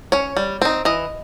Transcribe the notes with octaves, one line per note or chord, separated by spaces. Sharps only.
C#4 C#5
G3
C4 D#4
E3 D#5